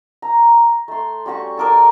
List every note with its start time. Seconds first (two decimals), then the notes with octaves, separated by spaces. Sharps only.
0.22 A#5
0.88 A3 C6
1.26 G3 C#4 F#4 C#6
1.57 A4 A#4 D5